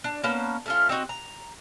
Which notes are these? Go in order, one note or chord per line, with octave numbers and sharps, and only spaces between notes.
D4
A#3 B3 C#4 A5
A3 C#4 F4
C4 D#4 F#4
A#5